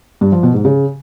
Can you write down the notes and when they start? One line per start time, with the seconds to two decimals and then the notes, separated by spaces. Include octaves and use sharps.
0.21 G2
0.32 F3
0.43 B2
0.54 G#2
0.65 C#3